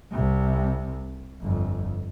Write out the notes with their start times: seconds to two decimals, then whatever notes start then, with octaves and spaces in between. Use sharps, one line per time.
0.11 C2 C3
1.42 G1 F2